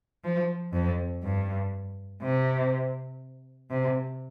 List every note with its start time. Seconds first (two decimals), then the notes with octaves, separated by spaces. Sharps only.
0.24 F3
0.73 F2
1.23 G2
2.22 C3
3.70 C3